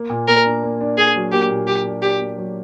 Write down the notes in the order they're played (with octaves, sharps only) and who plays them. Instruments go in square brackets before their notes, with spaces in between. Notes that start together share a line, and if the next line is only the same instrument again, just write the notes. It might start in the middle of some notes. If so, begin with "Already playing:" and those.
Already playing: [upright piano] A#3
A#2
[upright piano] A#2 [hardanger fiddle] A#4
[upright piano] D4
A#3
D4
[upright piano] D4 [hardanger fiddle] G#4
[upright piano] F#3
[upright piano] A#3 [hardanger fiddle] G4
[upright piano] A#2
[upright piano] F#3 [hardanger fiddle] G4
[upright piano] D4
[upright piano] D4 [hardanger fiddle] G4
[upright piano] A#3
F#3